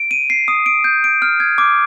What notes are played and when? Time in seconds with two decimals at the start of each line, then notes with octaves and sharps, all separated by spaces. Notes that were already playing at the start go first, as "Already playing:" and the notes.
Already playing: D7
0.11 D#7
0.30 C7
0.48 D#6
0.66 D7
0.84 G6
1.04 D7
1.22 F6
1.40 G#6
1.58 D6